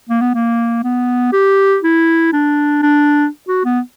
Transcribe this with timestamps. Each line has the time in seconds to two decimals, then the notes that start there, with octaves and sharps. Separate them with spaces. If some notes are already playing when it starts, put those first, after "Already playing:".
0.10 A#3
0.21 B3
0.34 A#3
0.84 B3
1.33 G4
1.84 E4
2.33 D4
2.83 D4
3.49 F#4
3.65 B3